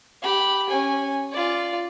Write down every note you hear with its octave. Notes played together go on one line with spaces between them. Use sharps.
G4 B5
C#4 G#5
F4 D5